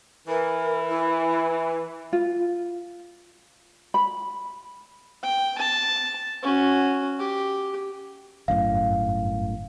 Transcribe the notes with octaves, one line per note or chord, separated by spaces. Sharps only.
E3 A#4
E4
F4
B5
G5
A5
C#4 F#4
G4
G1 F#2 A2 F5